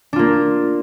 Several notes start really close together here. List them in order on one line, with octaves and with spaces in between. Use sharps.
D4 F4 A#3